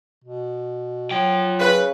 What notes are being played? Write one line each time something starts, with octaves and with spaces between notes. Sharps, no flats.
B2
F#3 F4 G5
C#3 B4